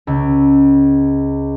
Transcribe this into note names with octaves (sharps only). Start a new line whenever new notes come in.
C#2